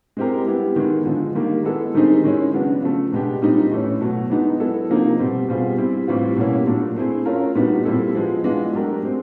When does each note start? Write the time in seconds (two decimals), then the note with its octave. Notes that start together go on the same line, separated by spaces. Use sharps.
0.17 G#3 C4 E4 G4 A#4
0.46 G3 B3 E4 G4
0.76 D#3 G#3 B3 E4
1.06 D3 F3 G#3
1.35 D#3 G3 A#3
1.65 G#3 B3 E4 A4
1.94 D#3 G3 C4 D#4 G#4
2.24 D#3 G#3 C#4 E4
2.54 C#3 F#3 B3 D4
2.82 C#3 F3 A3
3.12 B2 G#3 B3 D4 G4
3.42 A#2 G3 C4 D#4
3.71 A2 E3 A3 C#4
4.01 B2 F#3 A3
4.30 E3 G#3 B3 D#4
4.60 F#3 B3 E4 A4
4.90 C3 F3 A#3 D#4
5.19 B2 G3 C4
5.49 B2 G3 C4 F4 G#4
5.78 G3 C4 E4
6.07 A2 E3 G3 C4 F4
6.37 B2 G3 A#3 C#4 E4
6.67 A#2 F#3 A3 D4
6.97 A3 C4 E4 G#4
7.26 A3 C#4 F4 A#4
7.55 A#2 G3 B3 D#4 F#4
7.85 A#2 G3 C4 E4 A4
8.15 F3 G#3 B3
8.44 E3 G#3 B3 D4 F4
8.73 F#3 A3 D4 G4 A#4
9.03 G#3 C4